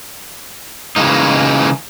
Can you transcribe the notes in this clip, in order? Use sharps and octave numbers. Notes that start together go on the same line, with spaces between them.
C#3 E3 G#3 A#3 D#4